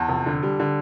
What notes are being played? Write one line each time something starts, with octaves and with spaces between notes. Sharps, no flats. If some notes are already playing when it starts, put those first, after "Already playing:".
Already playing: E2 A5
F1
D3
G3
D3